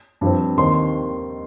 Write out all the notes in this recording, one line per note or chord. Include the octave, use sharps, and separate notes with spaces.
G2 F3 C4
D#2 D#3 C4 D#4 C6